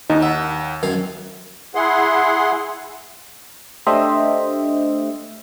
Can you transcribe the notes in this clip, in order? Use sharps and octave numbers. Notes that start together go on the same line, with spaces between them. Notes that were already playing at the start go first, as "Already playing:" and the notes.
D#2 D#4
E5 F#5
F#2 D#3 F5
E4 G#4 F#5 C6
A3 D4 G4 C5 D#5 E5